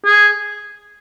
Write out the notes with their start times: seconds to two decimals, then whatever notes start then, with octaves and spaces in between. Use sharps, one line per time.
0.05 G#4